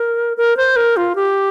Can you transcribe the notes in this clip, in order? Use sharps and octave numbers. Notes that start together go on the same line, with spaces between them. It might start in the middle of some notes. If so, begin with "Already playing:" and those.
Already playing: A#4
A#4
C5
A#4
F4
G4